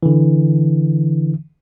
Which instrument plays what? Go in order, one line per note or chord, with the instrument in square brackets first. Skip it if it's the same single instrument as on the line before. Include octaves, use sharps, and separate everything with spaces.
[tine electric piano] D3 E3